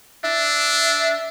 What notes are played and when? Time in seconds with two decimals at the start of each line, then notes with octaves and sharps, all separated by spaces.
0.24 D4 E5